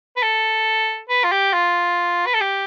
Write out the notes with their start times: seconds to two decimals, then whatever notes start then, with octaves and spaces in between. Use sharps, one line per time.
0.17 B4
0.23 A4
1.09 B4
1.24 F4
1.32 G4
1.53 F4
2.26 B4
2.34 A4
2.41 G4